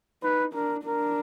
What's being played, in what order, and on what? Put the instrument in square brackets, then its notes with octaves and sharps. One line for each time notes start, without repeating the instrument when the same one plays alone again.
[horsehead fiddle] D#4 [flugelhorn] B4
[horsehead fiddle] D4 [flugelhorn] A#4
[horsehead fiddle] D4 [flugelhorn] A#4